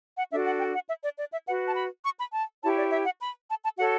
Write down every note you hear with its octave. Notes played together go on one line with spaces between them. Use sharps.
F#5
D4 F#4 A4 E5
F#5
G5
F#5
E5
D5
D5
E5
F#4 B4 F#5
A5
B5
C#6
B5
A5
E4 G4 C#5 A5
D5
E5
F#5
B5
A5
A5
F#4 A4 C#5 F#5